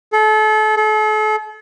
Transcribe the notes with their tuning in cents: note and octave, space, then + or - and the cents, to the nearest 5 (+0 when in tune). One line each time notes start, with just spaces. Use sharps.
A4 -35
A4 -40